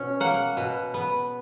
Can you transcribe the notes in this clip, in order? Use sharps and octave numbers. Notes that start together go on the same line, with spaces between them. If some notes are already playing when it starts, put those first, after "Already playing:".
Already playing: B2 C#4
A#3 F#5
B2
B3